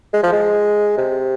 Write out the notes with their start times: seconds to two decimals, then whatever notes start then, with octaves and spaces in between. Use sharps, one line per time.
0.14 G#3
0.23 F3
0.32 G#3
0.98 C3